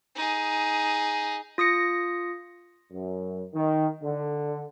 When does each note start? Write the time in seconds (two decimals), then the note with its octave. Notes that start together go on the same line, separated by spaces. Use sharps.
0.15 D#4 G#4
1.58 F4 D#6 A#6 C#7
2.91 F#2
3.54 D#3
4.02 D3